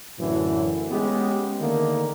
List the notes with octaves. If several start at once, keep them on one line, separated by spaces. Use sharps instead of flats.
F#2 A2 D3 E3
G#3 B3 C#4 G4
D3 D#3 A3 A#3